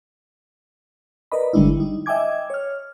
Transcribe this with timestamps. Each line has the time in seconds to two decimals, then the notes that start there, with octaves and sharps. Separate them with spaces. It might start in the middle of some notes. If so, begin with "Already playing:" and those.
1.32 A#4 B4 D5 D#5 B5
1.53 G1 D3 G3 G#3 D4 E4
1.77 G3 D#4
2.06 D#5 E5 G5 G#5 D6 G#6
2.50 C#5 F6